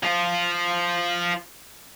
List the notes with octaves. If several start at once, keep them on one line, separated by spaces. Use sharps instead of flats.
F3 F4